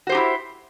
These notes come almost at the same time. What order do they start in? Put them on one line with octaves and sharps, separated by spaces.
F#4 C5 G4 D#4 E4